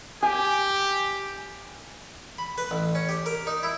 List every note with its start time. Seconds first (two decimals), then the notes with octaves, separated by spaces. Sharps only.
0.23 G4 G#5
2.38 B5
2.58 B4
2.71 A1
2.95 C#4
3.09 G4
3.26 A#4
3.47 D#4
3.63 E4